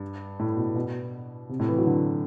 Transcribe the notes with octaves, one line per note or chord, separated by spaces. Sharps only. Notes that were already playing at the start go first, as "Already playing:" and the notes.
Already playing: G2
A2
B2
B2
C3
A2
E3
F#3
D3